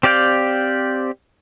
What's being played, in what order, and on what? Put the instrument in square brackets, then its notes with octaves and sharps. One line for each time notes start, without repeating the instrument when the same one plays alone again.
[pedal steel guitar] C4 G4 D5 F5 G5